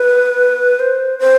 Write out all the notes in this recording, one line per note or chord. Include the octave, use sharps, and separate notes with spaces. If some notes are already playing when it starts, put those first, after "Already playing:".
Already playing: B4
C5
C5